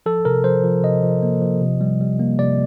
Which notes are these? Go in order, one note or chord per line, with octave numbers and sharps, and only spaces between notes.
F3 A4
C3 A#4
F3 C5
F3
C3 D#5
F3
A#3
F3
C3
G3
G3
A#3
C3 D5